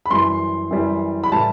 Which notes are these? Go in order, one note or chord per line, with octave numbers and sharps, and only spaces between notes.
B5
F#2 E3 G3 C6
F#2 E3 G3
B5
A2 E3 G3 A5